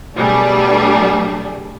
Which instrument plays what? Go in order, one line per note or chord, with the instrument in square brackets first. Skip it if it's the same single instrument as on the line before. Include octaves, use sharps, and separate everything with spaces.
[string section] B2 F#3 G3 A3 D4 G#4